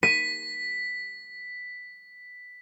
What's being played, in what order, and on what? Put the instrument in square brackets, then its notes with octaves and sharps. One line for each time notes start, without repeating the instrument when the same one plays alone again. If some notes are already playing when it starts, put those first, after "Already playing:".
[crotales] B6 [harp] D#7